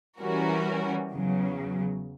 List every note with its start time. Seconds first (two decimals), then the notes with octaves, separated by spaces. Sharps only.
0.21 E3 G3 C#4 F#4 A#4
1.10 E2 C#3 F#3